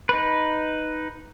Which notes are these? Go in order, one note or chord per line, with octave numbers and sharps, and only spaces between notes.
D#4 B4